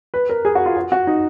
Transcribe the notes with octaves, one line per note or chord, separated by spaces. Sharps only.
B4
A#4
G#4
F#4
F4
F#4
F#4
D#4